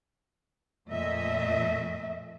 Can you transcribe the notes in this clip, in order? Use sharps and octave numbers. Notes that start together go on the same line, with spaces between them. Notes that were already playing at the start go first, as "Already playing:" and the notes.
F2 A#2 A3 D#5 E5